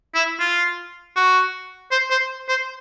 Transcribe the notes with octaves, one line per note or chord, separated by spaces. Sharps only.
E4
F4
F#4
C5
C5
C5